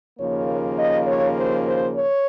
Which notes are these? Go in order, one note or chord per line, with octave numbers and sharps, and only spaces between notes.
D#2 C#3 F3 A#3 C#5
D#5
C#5
C5
C5
C#5